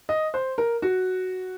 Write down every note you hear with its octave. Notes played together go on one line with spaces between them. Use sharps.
D#5
C5
A#4
F#4